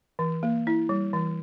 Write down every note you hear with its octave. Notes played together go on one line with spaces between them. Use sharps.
E3
A#3
E4
G3
E3